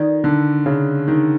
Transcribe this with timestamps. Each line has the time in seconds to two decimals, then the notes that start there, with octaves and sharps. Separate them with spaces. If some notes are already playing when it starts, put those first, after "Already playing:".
Already playing: D#3 F4 A4 D5
0.24 D3
0.66 C#3
1.08 D#3